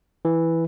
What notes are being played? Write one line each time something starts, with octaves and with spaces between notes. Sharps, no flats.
E3